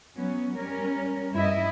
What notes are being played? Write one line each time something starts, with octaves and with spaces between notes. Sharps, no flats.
F#3 B3 C#4
G3 C#4 A#4
G2 E4 D#5 E5